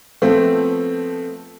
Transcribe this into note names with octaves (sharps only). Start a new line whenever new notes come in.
F3 A3 B3 C4